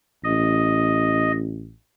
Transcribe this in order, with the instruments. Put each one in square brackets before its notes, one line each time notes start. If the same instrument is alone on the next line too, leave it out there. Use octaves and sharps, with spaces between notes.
[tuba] A1 [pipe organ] D#5